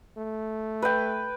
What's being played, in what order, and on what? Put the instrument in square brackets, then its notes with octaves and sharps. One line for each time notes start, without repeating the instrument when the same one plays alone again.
[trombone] A3
[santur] B4 G5